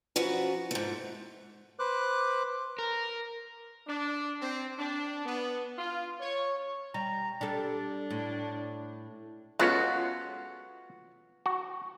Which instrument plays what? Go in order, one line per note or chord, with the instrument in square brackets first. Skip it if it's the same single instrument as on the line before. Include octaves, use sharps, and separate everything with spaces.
[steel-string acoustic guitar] F#2 F3 F#4 B4
G#2 A3
[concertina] B4 C5 D6 F#6
[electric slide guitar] A#4
[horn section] D4
C4
D4
B3
F4
C#5
[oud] G3 [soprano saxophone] A#5
[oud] G3 A4 [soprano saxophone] D4
[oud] A2
[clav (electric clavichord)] G#3 B3 C#4 [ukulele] F4 A4 B4 [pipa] F#4
[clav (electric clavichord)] F#4